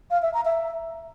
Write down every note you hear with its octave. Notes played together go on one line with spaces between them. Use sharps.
F5
E5
A#5
E5